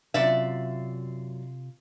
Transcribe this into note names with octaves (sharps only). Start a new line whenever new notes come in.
F#2 C3 F4 D5 E5